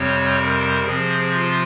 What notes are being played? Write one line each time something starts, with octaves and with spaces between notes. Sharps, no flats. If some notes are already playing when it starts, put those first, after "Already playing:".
Already playing: F2 C3 G3 C4 C#5
A#4
C3 F3 C4 G#4
F4